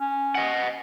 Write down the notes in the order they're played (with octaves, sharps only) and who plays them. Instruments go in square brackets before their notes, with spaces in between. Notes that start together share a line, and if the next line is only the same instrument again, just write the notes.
[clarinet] C#4
[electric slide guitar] D#5 F#5